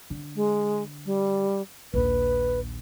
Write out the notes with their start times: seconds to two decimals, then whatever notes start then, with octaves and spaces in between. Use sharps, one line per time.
0.10 D3
0.36 G#3
1.06 G3
1.94 A#1 D#2 B4